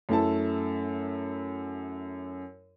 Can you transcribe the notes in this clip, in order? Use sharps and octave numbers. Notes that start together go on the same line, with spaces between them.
F#2 A3 E4 A5